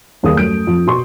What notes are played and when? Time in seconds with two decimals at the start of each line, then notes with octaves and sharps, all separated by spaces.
0.23 D#1 D#2 G#4 F5 D#6
0.35 F#2 A3 G6 D7
0.67 F2
0.87 B2 C6 C#6